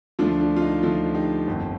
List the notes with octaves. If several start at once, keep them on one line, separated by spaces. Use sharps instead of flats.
D2 D3 F3 D4 F4
D4
F4
D#4
D2 D3 F3 D4 F4
D#4 G4
G1 F2 D#3